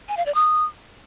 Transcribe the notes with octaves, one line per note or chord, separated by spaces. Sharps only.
G#5
F5
D5
D#6